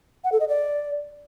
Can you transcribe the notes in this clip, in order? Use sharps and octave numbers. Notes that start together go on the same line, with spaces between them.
F#5
A4
D#5
D5